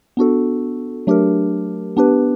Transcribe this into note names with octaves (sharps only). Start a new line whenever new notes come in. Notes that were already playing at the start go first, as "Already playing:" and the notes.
B3 D4 F#4 A4
F#3 A3 D4 G4 A#4
B3 D4 G4 B4